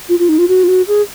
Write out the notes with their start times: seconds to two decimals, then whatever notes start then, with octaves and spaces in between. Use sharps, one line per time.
0.09 F4
0.19 F4
0.29 D#4
0.38 F4
0.48 F#4
0.63 F4
0.68 F#4
0.88 G#4